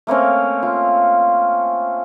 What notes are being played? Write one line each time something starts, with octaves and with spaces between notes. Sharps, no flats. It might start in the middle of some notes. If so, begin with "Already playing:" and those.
A3 A#3 C4 C#4
F4